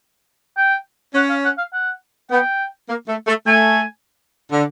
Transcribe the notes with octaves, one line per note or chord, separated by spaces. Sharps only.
G5
C#4 F#5
F5
F#5
F5
F#5
B3 G5
A#3
A3
A3
A3 G#5
D3